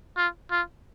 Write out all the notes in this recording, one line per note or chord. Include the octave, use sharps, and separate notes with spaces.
F4
F4